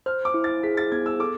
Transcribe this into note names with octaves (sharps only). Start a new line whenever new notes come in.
C5 F6
D6
E4
A6
G#4 B6
A6
B3 G#6
E6
A4 D6